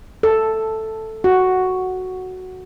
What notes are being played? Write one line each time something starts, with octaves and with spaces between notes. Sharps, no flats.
A4
F#4